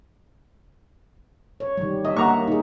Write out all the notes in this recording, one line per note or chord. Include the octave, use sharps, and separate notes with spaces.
C#5
D#3 G3
D#5 E5
A#3 F#5 A#5 C#6
D#4 G#4